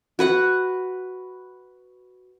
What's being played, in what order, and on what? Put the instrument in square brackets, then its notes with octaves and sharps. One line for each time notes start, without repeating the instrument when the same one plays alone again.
[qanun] F#4 B4 F#5